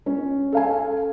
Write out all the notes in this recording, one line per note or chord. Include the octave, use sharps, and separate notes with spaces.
C#4
A4 F5 G#5